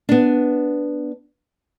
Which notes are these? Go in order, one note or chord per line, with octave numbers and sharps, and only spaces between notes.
B3 D4